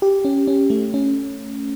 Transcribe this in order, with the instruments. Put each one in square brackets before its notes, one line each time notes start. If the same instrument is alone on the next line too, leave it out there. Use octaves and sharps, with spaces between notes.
[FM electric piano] G4
C#4
C#4
A3
C#4